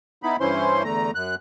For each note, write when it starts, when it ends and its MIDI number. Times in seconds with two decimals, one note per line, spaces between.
0.23 0.37 59
0.23 0.37 63
0.23 0.37 64
0.23 0.37 83
0.40 0.83 43
0.40 0.83 52
0.40 0.83 61
0.40 0.83 64
0.40 0.83 72
0.40 0.83 84
0.84 1.11 40
0.84 1.11 50
0.84 1.11 57
0.84 1.11 82
1.15 1.35 42
1.15 1.35 90